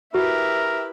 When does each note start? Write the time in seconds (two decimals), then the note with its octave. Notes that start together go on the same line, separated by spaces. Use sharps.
0.15 E4 F#4 G4 A#4 B4 E5